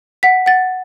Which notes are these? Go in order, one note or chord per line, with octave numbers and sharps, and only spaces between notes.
F#5 B6
F#5 A6